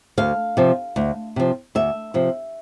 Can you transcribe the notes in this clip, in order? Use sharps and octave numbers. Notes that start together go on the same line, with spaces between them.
D2 F5
C3 F3
D2
C3 F3
D2 E5
C3 F3